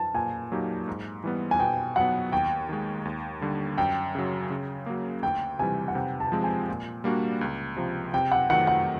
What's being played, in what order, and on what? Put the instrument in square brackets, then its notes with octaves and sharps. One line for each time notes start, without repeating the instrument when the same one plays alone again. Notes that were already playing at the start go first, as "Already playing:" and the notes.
Already playing: [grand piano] A5
[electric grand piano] A#2 [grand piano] G#5
[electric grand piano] F#3 A#3 D#4 G4
G#2
E3 G3 B3
[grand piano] G#5
[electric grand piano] B2 [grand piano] G5
[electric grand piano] F#3 B3 [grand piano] F#5
[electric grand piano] D#2 [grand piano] G5
[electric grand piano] D#3 G#3
D#2
D3 G3
[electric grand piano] F#2 [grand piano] G5
[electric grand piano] C#3 F#3
C#3
F#3 A#3
[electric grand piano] D2 [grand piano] G5
[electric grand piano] C3 E3 G3 [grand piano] G#5
[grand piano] F#5
[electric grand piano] C3 [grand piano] G5
[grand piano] A5
[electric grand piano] F3 G#3 C4
[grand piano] G#5
[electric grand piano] A#2
G3 A#3 D4 F#4
C#2
C3 F3
[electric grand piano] C3 [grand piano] G5
[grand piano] F#5
[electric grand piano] D#3 F#3 A3 [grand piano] F#5
[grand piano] F#5